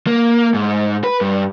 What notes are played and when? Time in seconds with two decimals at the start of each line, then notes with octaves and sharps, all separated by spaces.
0.07 A#3
0.54 G#2
1.04 B4
1.21 G2